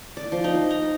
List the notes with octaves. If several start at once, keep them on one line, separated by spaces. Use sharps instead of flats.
D5
F3
D#4
A#5